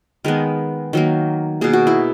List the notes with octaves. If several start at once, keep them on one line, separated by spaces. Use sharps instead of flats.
D#3 G#3 B3 A#4
D#3 F#3 A#3
B2 A#3 G#4
F#4
E4